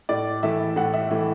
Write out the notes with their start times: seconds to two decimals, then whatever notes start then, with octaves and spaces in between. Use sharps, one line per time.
0.09 A2 D5
0.43 E3 A3 E5
0.76 A2 F#5
0.94 E5
1.10 E3 A3